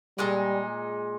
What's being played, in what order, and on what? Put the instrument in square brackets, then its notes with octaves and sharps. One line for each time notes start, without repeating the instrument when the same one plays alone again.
[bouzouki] A#2 G#3 D#4 [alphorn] G3